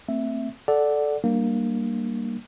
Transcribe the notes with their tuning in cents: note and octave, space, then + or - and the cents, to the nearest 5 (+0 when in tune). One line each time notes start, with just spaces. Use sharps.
A3 +40 C4 +5 E5 +0
A4 -10 D5 +0 F#5 +0
G3 +0 A#3 +0 D4 +15